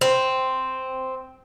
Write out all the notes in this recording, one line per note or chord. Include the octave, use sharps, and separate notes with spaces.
C4